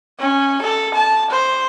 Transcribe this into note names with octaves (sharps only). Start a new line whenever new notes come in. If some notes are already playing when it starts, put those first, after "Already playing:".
C#4
A4
A5
C5